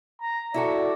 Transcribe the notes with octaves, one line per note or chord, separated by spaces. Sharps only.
A#5
E4 F#4 A4 D5